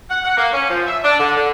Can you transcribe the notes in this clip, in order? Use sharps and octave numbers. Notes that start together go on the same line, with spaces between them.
F#5
F#5
A#3
C#4
F3
E5
D4
D3
D3